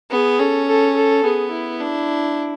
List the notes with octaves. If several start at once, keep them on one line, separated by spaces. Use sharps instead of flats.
B3 G#4
C#4 A4
A4
A4
B3 G#4
E4
D4